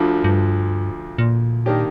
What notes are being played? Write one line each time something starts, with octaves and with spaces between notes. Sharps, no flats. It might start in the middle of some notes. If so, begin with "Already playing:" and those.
Already playing: D2 D3 F3
G2
A#2
D#3 A#3 D4 G4